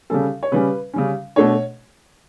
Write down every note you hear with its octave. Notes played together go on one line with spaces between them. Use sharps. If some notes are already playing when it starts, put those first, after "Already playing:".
C#3 G3 C#4 A4
C#5
C#3 G3 C#4 B4
C#3 G3 C#4
B2 A3 D4 C#5